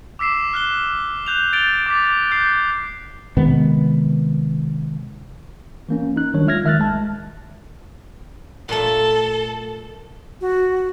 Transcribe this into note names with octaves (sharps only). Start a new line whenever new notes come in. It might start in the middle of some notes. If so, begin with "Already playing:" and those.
D6 E6 B6 C7 E7
F6 F#6 G7
F#6 G6 F7
G6 A6 D7 F7 G7
D6 A6 B6
F#6 G6 C7
C3 D#3 G#3 B3
E3 A#3 C#4
D#4 F#6
D#3 F#3 G3 D4 C#5
G#3 F4 E5 F6 G#6 A#6
D#3 E5 F6 F#6 A6
A#1 G#3 A5
A#2 A3 A4
F#4